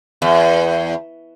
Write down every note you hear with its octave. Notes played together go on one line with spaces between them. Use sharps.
E2